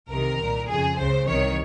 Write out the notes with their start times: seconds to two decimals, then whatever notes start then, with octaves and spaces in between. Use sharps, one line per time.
0.10 C2 C3 D#3 A#4
0.39 C2 A#2
0.69 F2 C#3 G#4
0.98 C#2 C#3 C5
1.27 C2 C3 D#3 C#5